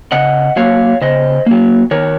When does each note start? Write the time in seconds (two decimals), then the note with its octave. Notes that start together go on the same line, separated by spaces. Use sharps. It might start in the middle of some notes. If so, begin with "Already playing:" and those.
0.12 C#3 D#5 F#5
0.56 F#3 A#3 C#5 F5
1.01 C#3 C5 D#5
1.46 F#3 A#3
1.91 D#3 A#4 C#5